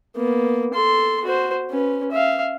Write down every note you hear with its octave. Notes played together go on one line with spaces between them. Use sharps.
A#3 B3
A4 C6
F#4 C5
C#4 B4
E5 F5